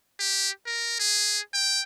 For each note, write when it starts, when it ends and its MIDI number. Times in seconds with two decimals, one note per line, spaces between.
0.20 0.50 67
0.66 0.98 70
1.00 1.39 68
1.54 1.81 79